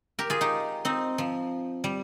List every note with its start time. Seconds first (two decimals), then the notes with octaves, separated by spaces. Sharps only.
0.19 G4 A#4
0.30 F4 G#4
0.41 D#4 G4
0.85 C4 D#4
1.18 F3
1.84 G3